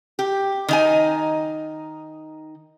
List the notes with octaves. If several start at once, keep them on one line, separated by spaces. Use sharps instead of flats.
G4
D#3 D#4 G#5